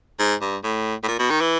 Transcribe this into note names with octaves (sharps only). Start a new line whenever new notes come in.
G#2
G2
A2
A2
A#2
B2
D#3
E3